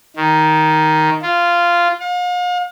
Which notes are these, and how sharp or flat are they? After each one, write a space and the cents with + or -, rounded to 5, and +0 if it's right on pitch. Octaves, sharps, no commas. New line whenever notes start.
D#3 +5
F4 -10
F5 +40